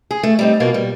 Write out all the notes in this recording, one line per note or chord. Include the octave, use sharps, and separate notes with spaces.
G#4
A3
G3 C4 D#4
B2 A#3 F4
G3